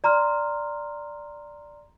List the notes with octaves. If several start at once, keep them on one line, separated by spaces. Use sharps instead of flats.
D5 A#5 C6 F6